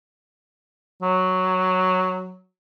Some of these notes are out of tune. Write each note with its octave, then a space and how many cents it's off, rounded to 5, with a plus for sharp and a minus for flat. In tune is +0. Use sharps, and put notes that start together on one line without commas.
F#3 +0